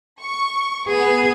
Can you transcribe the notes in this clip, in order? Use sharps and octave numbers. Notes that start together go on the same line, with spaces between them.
C#6
B3 G#4